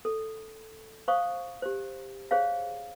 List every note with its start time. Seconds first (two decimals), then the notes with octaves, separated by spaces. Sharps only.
0.05 A4
1.08 C5 F5 C#6 D#6
1.62 G4 C5
2.31 G#4 C5 C#5 F5